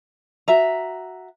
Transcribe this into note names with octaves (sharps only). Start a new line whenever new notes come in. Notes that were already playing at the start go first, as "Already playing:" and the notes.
F#4 E5 A#5